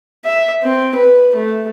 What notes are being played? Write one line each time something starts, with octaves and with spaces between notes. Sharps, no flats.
E5
C4
B4
A3